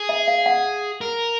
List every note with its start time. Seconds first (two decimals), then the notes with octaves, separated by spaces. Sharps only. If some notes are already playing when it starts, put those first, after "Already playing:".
Already playing: G#4
0.09 E5
0.28 F5
0.46 F#5
1.01 A#4